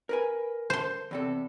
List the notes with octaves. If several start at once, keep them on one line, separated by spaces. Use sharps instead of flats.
A#4 B4 G#5
C5 C6
E2 C3 A4